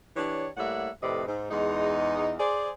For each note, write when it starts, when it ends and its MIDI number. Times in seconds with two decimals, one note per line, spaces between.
0.16 0.48 52
0.16 0.48 62
0.16 0.48 67
0.16 0.48 73
0.57 0.89 45
0.57 0.89 55
0.57 0.89 58
0.57 0.89 76
0.57 0.89 78
1.03 1.23 41
1.03 1.23 45
1.03 1.23 48
1.03 1.23 71
1.03 1.23 74
1.03 1.23 75
1.27 1.50 44
1.51 2.33 40
1.51 2.33 56
1.51 2.33 63
2.39 2.70 68
2.39 2.70 72
2.39 2.70 74